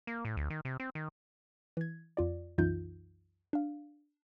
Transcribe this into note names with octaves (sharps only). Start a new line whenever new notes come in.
A#3
A2
D2
D#3
C3
C4
D#3
E3 G#6
F2 F4 D5
C2 F#2 E3 D#4 F4 G6
D4 F5